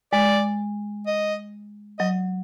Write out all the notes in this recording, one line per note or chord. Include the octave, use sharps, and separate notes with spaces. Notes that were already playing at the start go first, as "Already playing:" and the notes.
G#3 D5
D#5
F#3 D#5